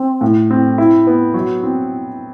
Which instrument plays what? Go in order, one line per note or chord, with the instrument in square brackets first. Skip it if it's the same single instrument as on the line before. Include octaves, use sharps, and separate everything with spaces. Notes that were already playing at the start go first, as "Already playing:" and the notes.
Already playing: [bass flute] C4
[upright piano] A2
C4
E4
B3
F#3
C4